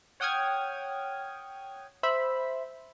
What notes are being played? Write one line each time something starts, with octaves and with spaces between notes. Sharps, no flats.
C#5 F#5 G5 D#6 F6 G#6
C5 E5 B5